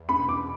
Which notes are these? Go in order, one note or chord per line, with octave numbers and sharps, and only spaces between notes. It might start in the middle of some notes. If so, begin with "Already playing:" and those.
Already playing: E2
B5
B2
D6